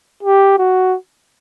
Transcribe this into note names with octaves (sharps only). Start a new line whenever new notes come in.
G4
F#4